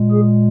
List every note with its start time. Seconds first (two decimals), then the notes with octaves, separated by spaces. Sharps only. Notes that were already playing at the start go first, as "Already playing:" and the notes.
Already playing: A#2 G#3
0.11 G#4